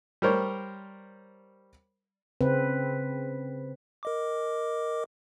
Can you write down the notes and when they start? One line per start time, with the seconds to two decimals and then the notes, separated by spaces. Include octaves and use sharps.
0.22 G3 A#4 C5 C#5
2.41 C#3 C4 B4
4.03 A#4 D#5 D6